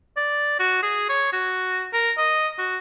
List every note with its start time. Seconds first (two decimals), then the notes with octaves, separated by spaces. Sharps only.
0.17 D5
0.60 F#4
0.83 G#4
1.09 C#5
1.33 F#4
1.93 A#4
2.18 D#5
2.58 F#4